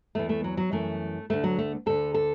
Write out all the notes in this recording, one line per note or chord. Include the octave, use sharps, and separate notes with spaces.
E2 E3 A3
A3
F#3
F#3
F#2 E3 A3
D2 D3 A3
F#3
A3
D2 D3 A4
A4